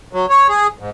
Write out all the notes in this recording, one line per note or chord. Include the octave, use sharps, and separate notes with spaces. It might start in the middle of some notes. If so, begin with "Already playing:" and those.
F#3
C#5
G#4
G#2